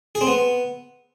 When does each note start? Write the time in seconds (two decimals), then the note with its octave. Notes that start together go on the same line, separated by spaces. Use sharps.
0.15 G#4
0.21 C4
0.27 B3